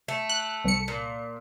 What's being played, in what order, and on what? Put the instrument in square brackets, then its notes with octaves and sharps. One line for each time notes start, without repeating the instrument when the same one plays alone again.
[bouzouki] A3
[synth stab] F#6
C2 C#7
[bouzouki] A#2